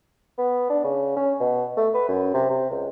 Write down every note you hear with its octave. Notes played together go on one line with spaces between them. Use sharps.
B3
D4
C#3
C#4
B2
A3
B4
F#2
C3
C3
C#2